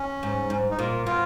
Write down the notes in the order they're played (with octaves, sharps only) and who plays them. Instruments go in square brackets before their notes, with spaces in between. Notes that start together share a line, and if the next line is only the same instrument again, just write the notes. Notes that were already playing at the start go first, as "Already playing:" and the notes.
Already playing: [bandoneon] C#4
[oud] G#2
G#2
[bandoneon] D#4
[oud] A#2 [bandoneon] F4
[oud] B2 [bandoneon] F4